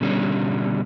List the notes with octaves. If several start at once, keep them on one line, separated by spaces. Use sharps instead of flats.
B2 D3 G3 B3 C#4